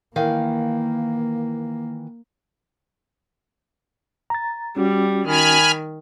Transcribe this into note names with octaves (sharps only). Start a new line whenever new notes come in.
D#3 E3 A#3 F5
A#5 A6
G3 C#4 F#4
D#3 G#5 B5 F6